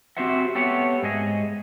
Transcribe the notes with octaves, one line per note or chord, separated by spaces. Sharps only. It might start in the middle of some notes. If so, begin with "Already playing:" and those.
C4 F#4 G4 C5 E5 F#5
A3 B3 G4 C#5 F#5
G#2 G#4 D#5